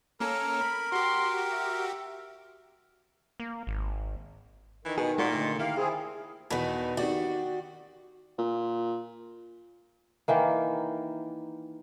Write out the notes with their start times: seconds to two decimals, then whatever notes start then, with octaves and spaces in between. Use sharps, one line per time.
0.20 A#3 C#4 A4 A#4 A#5
0.61 B5
0.92 F#4 G4 C6
1.52 E5
3.40 A#3
3.67 G#1
4.85 D#3 E3
4.98 B2 G#4
5.18 A#2 G#3 F#4
5.32 D3 A3
5.59 D#3 A#3 E4 G4 F5
5.77 C4 E4 G#4
6.50 E2 B2 D#3 B4
6.97 D#3 F#4 G4 D5
8.38 A#2
10.28 D#3 E3 A#3